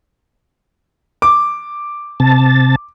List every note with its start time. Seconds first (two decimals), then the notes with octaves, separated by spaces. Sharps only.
1.22 D6
2.20 C3 A5